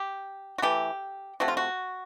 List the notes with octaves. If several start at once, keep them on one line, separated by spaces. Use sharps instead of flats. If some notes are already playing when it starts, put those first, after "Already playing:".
Already playing: G4
F#4
E3 A3 G4
C3 F3 A3 F#4
F4
F#4